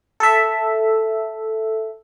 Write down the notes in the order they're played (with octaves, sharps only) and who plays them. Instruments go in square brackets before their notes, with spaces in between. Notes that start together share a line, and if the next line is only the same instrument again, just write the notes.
[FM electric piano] A4 E5